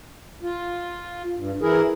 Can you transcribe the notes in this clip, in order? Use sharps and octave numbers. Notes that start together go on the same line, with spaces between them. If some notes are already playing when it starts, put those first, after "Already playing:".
F4
G2
E3 E4 G#4 A#4